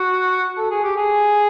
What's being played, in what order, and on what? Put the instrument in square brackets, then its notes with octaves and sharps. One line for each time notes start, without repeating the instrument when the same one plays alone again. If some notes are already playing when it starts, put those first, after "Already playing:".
Already playing: [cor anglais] F#4
A4
G#4
G4
G#4